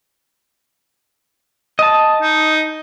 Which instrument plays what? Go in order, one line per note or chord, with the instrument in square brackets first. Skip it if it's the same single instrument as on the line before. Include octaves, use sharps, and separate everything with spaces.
[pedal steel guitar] D#5 A5
[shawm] D#4